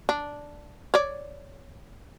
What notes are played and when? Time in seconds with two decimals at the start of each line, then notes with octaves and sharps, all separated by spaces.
0.09 D4
0.94 C#5 D5